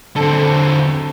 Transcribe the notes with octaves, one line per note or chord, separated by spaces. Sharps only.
D3 C4 A4